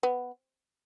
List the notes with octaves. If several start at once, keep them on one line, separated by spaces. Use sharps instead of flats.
B3